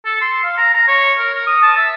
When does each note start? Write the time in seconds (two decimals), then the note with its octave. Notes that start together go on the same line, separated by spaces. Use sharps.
0.05 A4
0.21 C6
0.44 F5
0.58 A#5
0.74 A#5
0.88 C#5
1.18 A#4
1.34 A#4
1.47 D#6
1.62 A5
1.77 E5